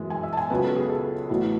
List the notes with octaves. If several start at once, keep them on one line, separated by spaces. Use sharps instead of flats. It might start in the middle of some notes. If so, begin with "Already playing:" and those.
Already playing: F#2 E3 G#3
G#5
E5
A5
G#5
C#2 C#3 F#3 B3 B4
A4
G#4
A4
A1 A2 F#3 B3